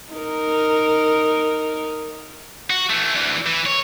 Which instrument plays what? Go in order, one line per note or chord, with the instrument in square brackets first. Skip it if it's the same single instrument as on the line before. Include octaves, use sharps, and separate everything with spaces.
[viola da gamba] D#4 A#4
[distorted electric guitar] F#4
E3 A3
D2 E3
E3
C#5